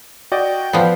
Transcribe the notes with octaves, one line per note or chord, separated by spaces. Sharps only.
F#4 D5 D#5 G5
F3 B3 D5